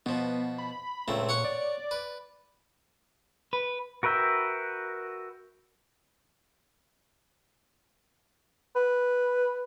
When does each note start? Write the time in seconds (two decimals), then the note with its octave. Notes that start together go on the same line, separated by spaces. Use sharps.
0.06 B2 F3 B3
0.58 B5
1.08 C#2 A#2 A3 C4
1.29 C#5 F#5 C#6
1.44 D5
1.91 B4
3.53 B4
4.03 F#4 A#4 B4 E5 G5
8.76 B4